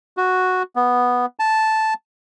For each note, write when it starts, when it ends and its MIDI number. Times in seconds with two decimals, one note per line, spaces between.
0.17 0.63 66
0.76 1.26 59
1.39 1.94 81